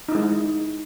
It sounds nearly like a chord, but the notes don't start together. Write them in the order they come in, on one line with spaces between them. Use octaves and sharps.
D#4 E4 G#3